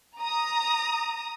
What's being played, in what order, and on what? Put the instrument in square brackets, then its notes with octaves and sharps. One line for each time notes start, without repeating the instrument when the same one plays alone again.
[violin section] A#5 D#6